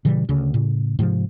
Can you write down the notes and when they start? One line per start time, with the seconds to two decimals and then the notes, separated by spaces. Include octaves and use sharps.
0.05 A#2 C#3 E3 G3
0.29 D2 C#3
0.54 A2 C#3
0.99 G#2 C3 F3